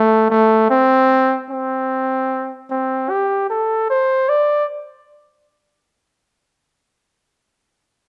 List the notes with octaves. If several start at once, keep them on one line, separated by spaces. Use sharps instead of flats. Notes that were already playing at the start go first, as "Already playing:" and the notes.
Already playing: A3
A3
C4
C4
C4
G4
A4
C5
D5